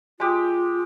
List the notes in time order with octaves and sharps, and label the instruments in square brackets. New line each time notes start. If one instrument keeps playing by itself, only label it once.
[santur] G#3 G4 [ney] F4